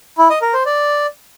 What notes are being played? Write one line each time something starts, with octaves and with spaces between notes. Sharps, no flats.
E4
D#5
A#4
C5
D5